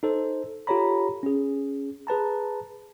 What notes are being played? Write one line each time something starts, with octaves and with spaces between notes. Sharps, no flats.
D#4 A4 C5
F4 G4 A4 C#5 A#5 B5
C#4 G#4
G#4 B4 A5 A#5